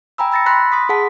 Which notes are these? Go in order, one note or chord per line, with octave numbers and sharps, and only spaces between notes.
G5 G#5 A#5 B5 E6
B5 E6 A6 A#6 C#7
B5 C6 F#6 A#6 B6
C6 D#6 B6
G#4 F#5 A5 B6